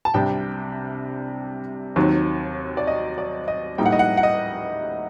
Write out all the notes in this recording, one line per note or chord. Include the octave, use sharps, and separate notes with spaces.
A5
C2 C3 G3 D4 G5
D#2 D#3 F#3 C4
D5
D#5
D5
D#5
A2 G3 A#3 D#4 G5
F#5
D#5
F#5
F#5
D#5